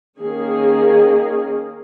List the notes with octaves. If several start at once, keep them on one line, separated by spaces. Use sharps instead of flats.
D#3 A#3 C#4 G#4